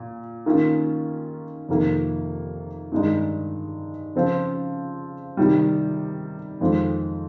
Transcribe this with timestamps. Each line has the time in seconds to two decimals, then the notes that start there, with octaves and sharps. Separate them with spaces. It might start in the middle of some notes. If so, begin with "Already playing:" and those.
Already playing: A#2
0.46 D#3 A#3 C#4 F4
1.69 F2 C3 D#3 A#3
2.92 G2 D#3 G#3 D#4
4.15 C#3 F3 C4 F4
5.37 C3 D#3 G3
6.61 F2 D#3 G#3 C4 F4